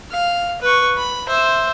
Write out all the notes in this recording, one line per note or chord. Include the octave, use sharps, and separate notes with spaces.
F5
B4 C#6
B5
C5 E5